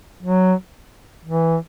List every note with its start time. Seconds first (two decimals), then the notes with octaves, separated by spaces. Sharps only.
0.22 F#3
1.25 E3